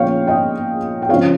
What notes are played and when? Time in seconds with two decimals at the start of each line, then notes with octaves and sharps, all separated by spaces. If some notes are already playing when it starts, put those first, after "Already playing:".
Already playing: A#2 F3 A#3 C#4 C#5 F5 G5
0.27 D#5 G5
1.02 G5
1.09 C#3 F3 C4 C#5 F5